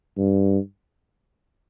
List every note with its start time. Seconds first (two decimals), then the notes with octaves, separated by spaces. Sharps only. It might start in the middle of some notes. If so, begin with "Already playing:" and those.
0.17 G2